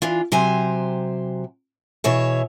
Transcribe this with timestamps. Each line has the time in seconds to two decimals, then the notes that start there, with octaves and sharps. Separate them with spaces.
0.02 E3 D4 F4
0.32 C3 F#3 G4 C5 G#5
2.04 B2 E3 G#4 C#5 E5